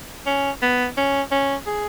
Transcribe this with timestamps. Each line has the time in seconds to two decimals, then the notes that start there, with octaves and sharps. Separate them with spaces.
0.26 C#4
0.62 B3
0.97 C#4
1.31 C#4
1.66 G#4